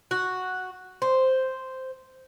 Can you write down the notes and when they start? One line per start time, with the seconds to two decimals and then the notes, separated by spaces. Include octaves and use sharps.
0.11 F#4
1.02 C5